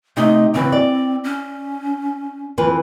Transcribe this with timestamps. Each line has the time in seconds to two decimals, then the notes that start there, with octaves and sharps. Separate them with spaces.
0.17 C3 A3 D#4 D#5
0.54 C#3 E3 C4
0.72 D5
1.24 C#4
2.58 F2 E3 B4